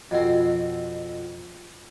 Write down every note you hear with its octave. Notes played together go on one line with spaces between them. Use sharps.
F2 B2 C4